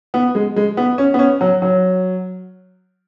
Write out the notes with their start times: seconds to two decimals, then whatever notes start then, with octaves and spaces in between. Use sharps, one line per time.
0.14 B3
0.35 G#3
0.56 G#3
0.77 B3
0.98 C#4
1.14 B3
1.19 C#4
1.41 F#3
1.62 F#3